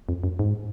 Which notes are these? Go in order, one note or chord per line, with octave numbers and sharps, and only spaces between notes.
F2
F#2
G#2